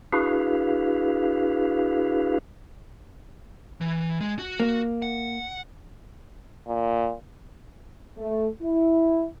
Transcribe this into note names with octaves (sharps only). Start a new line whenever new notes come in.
D4 E4 F#4 G#4 B4 F5
E3
G#3
F#4
A#3
F#5
A#2
A3
E4